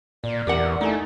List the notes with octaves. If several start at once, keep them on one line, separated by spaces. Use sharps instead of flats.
A#2 D5
E2 G4 A#4 F#5
A3 D#4 E4 G#5